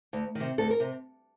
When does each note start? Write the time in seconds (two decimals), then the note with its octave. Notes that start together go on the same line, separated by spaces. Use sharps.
0.13 D2
0.35 D#3
0.40 C3
0.58 D2 A4
0.70 A#4
0.80 C3